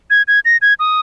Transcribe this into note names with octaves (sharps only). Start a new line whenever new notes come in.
G#6
G#6
A#6
G#6
D#6